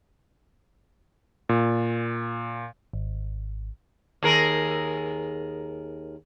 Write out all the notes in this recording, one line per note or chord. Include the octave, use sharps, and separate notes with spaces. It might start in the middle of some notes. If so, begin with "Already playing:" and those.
A#2
G#1
D#2 G#4 A#4